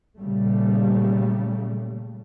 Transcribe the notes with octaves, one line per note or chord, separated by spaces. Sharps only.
A#2 C#3 G3 A3